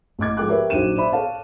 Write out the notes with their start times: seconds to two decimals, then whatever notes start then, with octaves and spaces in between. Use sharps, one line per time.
0.19 A1 D#5 D6 G#6
0.37 G#2 F3 A4 G5 D6 F#6
0.49 G4 A#4 B4 C#5 E5 G5
0.70 A#1 F#3 D#4 C5 D#7 E7
0.95 C5 D5 E5 B5
1.12 A4 C#5 F5 A5